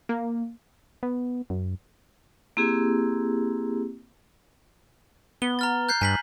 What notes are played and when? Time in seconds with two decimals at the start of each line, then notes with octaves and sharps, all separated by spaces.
0.09 A#3
1.03 B3
1.50 F#2
2.57 A#3 C4 E4 G4 G#4
5.42 B3 G7
5.59 A#5 F6 A6
5.89 F#6 G6 C7
6.01 G2 G#5 B6 F#7